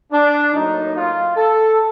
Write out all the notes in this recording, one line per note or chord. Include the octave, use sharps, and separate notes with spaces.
D4
A2 F#3 A#3 D#4
F4
A4